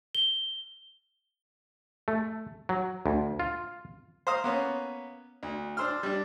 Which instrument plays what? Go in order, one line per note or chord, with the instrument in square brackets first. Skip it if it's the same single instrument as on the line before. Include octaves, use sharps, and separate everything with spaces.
[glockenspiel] G7
[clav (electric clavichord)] A3
F#3
D2
F4
[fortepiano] C5 F5 A#5 D#6
A#3 B3 C#4
D2
D4 C5 C6 E6 F6
G3 D4